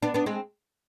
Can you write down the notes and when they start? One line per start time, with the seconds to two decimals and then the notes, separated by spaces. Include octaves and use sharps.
0.03 B3 D4
0.14 B3 D4
0.26 G#3 C4